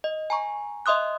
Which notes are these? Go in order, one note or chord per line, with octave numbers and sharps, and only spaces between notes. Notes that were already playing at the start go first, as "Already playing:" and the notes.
D#5
G#5 A#5 C#6
D#5 E5 C6 D#6 F#6